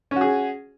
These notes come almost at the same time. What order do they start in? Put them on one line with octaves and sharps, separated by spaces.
C#4 F#4 G#4